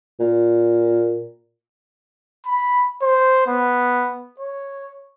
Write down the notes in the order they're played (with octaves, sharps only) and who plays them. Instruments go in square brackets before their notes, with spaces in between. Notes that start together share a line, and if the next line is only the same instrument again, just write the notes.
[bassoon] A#2
[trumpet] B5
C5
B3
C#5